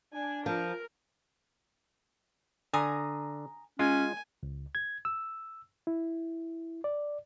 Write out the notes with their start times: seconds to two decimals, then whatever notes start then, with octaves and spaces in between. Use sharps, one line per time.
0.13 D4 G#5
0.46 F3 A#4
2.74 D3 G#5 A#5 D#6
3.79 G#3 C#4 F4 G#5
4.43 C#2
4.75 G#6
5.05 E6
5.87 E4
6.84 D5